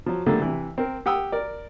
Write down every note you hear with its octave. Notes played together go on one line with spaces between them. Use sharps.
F3 F#3
A#2 D3 F3 G3 A3 A#3
C3 E3
C4 A#4
G4 F#5 G5 D#6 E6
A#4 D5